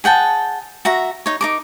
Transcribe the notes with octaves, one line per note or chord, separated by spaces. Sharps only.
G#4 F#5 G5 A5
F#4 E5 A#5
D#4 C#5
D#4 A#4 D6